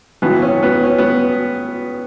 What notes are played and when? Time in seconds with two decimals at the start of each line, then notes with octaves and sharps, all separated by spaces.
0.22 G#1 F#2 C#3 E3 B3
0.42 C#4
0.63 B3
0.83 C#4
0.98 B3